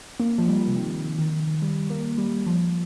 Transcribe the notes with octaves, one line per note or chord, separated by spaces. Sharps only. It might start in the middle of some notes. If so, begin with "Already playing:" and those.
A#3
F3
G3
C3
D#3
D#3
G3
A#3
G3
F3